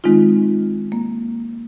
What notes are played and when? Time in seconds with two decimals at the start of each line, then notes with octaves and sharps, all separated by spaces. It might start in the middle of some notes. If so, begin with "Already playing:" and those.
0.04 D#3 G#3 C4 D#4 F4
0.92 A#3